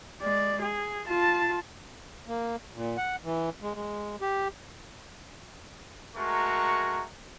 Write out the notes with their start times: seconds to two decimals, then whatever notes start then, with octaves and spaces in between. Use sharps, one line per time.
0.22 G#3 D5
0.62 G#4
1.07 F4 A5
2.28 A#3
2.74 A#2
2.97 F#5
3.24 E3
3.62 G#3
3.75 G#3
4.21 G4
6.16 G#3 A3 F#4 A#4 A#5 C#6